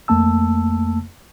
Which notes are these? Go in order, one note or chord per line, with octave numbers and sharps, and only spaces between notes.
F2 A3 A#3 A5 E6